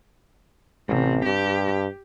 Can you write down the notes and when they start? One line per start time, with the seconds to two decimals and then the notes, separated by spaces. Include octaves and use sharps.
0.88 A1 C3
1.25 G2 G4